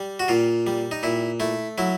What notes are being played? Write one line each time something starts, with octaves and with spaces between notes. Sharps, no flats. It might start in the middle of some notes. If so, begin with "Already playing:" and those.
Already playing: G3
F#4
A#2 F4
G3
D#4
A#2 E4
A3 E4
F#3 E4